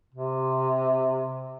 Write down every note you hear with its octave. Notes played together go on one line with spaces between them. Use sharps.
C3